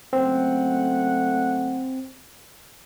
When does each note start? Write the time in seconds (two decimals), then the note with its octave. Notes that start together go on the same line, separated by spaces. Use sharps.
0.13 F#1 A3 C4 F#5